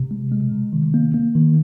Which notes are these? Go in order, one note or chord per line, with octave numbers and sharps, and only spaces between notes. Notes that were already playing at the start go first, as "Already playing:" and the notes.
Already playing: C3
G#3
G#3
C3
D#3
A#3
A#3
D#3